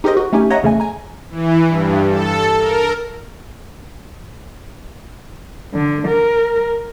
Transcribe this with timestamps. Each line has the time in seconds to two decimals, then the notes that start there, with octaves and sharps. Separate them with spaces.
0.04 D#4 G4 G#4 A#4 C5 D#5
0.17 F#4 A#4
0.33 A3 C#4 D#4 G4 G#5
0.50 C#5 D#5 E5 F#5 A#5 A#6
0.63 E2 C#3 A3 G#5
0.80 G#5 A#5
1.30 E3
1.68 G2
2.09 A4
2.59 A#4
5.74 D3
6.08 A#4